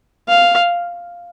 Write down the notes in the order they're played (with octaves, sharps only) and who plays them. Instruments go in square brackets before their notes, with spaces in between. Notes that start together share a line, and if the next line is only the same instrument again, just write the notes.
[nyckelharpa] F5